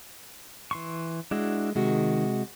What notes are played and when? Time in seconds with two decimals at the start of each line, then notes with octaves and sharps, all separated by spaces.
0.71 E3 C6 C#6
1.31 G#3 D4 E4 F#4
1.75 C3 D#3 G#3 F#4